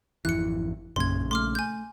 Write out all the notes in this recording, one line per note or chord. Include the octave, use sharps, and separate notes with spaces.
G#1 F2 E3 E4 F#6 C#7
A#1 F#2 C#3 A#3 C6 G#6
A3 C6 D6 F6
G#5 G6